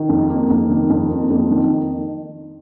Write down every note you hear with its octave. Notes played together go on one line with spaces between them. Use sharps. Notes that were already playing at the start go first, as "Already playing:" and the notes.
Already playing: D#3
F2
A#3
F2
D#3
F2
A#3
F2
D#3